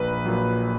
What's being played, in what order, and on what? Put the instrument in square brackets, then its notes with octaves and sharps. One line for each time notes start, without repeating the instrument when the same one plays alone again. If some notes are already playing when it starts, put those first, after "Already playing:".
Already playing: [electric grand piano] A#1 B4
A#2 F#3